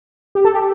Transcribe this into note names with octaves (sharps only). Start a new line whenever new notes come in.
G4
A4
G4